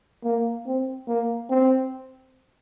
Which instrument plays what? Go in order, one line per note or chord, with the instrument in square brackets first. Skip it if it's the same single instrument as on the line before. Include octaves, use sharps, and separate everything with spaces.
[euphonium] A#3
C4
A#3
C4